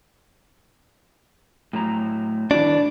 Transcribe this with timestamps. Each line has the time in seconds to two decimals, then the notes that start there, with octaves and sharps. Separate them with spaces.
1.73 A2 F#3 A#5
2.51 D#3 D4 E4 F#4